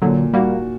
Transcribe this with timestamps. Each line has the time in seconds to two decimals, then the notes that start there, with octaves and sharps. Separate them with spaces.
0.02 A#2 D3 F#3
0.33 G3 A#3 F#4